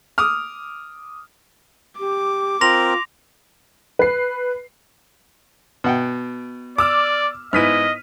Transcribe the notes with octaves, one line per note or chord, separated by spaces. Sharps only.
D6 D#6 F6
G4 D6
C4 F4 A#4 C6 A#6 F7
B4 C7
B2 F#5 G5
D5 D6 E6 F6
G#2 B3 E4 D#5 F6 B6 D#7